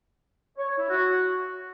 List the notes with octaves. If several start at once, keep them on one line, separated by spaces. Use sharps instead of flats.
C#5
C#5
E4
F#4